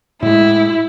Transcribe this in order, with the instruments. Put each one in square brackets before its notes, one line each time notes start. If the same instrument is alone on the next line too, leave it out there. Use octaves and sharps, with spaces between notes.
[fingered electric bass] A2 G#3 [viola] E4